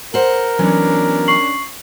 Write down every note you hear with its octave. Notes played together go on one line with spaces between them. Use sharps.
A#4 C5 F#5
E3 F#3 B3 C#4 D4
C#6 C7 F#7